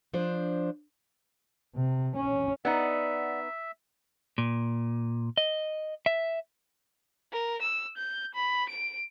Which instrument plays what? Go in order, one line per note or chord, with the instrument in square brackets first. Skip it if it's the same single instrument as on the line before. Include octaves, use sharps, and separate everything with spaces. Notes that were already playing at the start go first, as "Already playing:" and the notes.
[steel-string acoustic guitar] F3 D4 C5
[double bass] C3
C#4
[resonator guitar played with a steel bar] B3 D#4 [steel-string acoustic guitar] D5 F#5 [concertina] E5
[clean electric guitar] A#2
D#5
E5
[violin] A#4
E6
G6
B5
D7